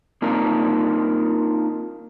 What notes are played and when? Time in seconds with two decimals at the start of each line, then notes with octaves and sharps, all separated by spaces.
0.22 A#3 C4 D4 D#4 F4 A#4